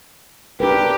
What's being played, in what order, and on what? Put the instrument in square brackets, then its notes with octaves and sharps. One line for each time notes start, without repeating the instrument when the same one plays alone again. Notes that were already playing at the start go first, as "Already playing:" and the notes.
[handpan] D4 A#4 B4 [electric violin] G4